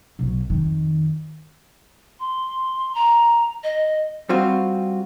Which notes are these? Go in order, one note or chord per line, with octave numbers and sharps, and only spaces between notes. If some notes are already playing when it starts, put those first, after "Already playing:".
B1 F#3
F2 D#3
C6
A#5
D#5
G3 C4 F4 F#4